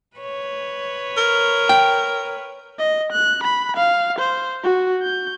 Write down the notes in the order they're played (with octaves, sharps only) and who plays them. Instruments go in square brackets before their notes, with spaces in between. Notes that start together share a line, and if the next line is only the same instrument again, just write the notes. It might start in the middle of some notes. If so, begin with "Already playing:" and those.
[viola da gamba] B4 C#5
[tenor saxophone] A#4
[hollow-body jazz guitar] G5
[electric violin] D#5
F#6
B5
F5
C5
F#4
G6